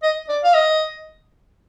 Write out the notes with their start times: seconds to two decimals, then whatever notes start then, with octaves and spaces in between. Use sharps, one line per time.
0.03 D#5
0.29 D5
0.44 F5
0.54 D#5